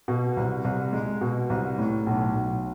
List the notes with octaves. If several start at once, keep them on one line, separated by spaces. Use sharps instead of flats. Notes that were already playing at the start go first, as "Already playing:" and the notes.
B2
C2
C2
G#3
B2
C2
A2
B1
B1